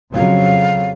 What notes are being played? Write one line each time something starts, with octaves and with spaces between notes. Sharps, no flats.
F2 C#3 F#3 F5